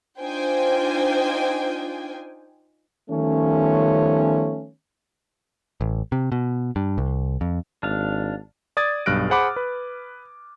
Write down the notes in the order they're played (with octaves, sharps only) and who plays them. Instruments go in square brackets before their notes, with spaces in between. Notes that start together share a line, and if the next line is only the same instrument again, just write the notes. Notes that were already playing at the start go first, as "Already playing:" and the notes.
[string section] D4 D#4 F4 C5 G5 G#5
[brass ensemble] D#3 F3 G3 A3 B3 C#4
[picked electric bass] A1
C3
B2
G2
C2
F2
[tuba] G#1 [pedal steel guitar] D4 F5
[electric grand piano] D5 D#6 G#6 A6
B1 G2 F6 F#6 A#6 D7
G#4 C5 F#5 B5 D6
B4